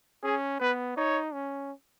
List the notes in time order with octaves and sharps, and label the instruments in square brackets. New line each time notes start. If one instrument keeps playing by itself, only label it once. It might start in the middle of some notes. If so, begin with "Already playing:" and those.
[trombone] C#4 [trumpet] G#4
[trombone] B3 [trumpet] B4
[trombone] D#4 [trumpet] C#5
[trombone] C#4